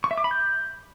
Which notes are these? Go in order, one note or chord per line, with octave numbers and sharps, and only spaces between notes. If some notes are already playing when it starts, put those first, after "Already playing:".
C#6
E5
D6
B5
G6